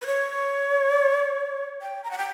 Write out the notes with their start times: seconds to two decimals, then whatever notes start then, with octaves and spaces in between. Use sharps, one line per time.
0.02 B4
0.06 C#5
1.82 G5
2.04 A#5
2.11 F#5
2.18 G5